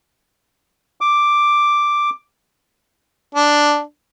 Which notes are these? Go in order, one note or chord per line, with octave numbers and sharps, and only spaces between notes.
D6
D4